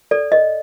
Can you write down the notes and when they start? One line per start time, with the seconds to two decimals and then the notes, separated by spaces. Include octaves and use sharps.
0.11 A4 D5
0.32 D#5